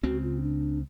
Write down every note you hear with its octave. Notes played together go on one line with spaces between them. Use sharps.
C#2 C#3 C4 F#4
F4
D4